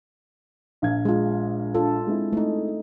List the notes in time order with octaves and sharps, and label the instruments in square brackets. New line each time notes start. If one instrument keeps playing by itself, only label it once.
[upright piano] A#1 F5 G#6
[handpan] G#3 F4
D4 F4 A4
[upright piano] G#3 C4 E4
[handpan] A3 D#4